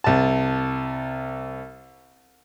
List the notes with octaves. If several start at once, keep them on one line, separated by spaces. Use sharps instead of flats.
C2 A5